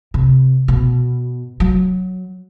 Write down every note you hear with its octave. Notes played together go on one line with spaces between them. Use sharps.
C3
B2
F#3